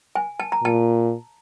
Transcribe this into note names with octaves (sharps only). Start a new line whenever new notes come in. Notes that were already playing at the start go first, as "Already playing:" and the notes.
G#5
A5
A#5
A#2 A5